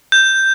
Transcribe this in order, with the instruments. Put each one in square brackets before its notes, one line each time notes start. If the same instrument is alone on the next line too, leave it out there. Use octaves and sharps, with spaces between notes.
[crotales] G6